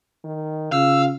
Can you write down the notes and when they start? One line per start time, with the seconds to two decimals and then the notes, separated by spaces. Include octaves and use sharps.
0.24 D#3
0.72 C#3 F4 F5 E6